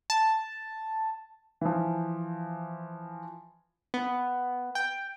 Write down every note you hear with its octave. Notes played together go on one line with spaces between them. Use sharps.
A5
E3 F3
B3
G5